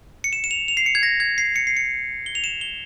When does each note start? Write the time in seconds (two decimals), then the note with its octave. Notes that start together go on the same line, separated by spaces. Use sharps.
0.24 C#7
0.33 E7
0.44 E7
0.51 F7
0.68 F7
0.77 C7
0.86 C#7
0.95 G#6
1.03 A#6
1.20 G#6
1.38 C7
1.56 C#7
1.67 C7
1.77 C#7
2.26 G7
2.35 F7
2.44 E7
2.61 G7